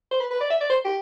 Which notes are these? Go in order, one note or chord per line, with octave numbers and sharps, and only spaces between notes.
C5
B4
B4
D5
E5
D5
C5
G4